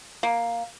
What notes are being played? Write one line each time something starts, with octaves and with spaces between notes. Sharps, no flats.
A#3